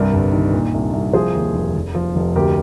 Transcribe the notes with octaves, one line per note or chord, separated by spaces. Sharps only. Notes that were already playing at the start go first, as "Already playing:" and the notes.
Already playing: C2 G2 A#4 D5
G1
D#3
A#2
C2
C2
F3 G#4 C5
D#2
F1
F1
F3
F1
D2 G4 A#4